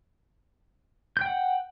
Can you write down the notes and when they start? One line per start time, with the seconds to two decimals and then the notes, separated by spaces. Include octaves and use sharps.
1.17 G6
1.21 G5
1.26 F#5